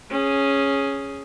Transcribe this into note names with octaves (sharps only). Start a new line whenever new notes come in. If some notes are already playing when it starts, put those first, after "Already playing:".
C#4 G#4